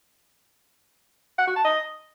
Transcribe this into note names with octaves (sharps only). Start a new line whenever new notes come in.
F#5
F#4
A5
D#5